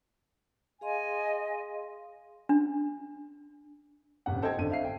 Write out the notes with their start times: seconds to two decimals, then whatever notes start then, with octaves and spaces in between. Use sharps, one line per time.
0.81 G#4 D#5 F5 G#5 C6
2.49 D4
4.26 D#1 G#1 C#3 F#5
4.42 A4 C5 D#5 G5 A5 G#6
4.58 G#1 D3 D#7
4.71 E5 F5 C7
4.84 G5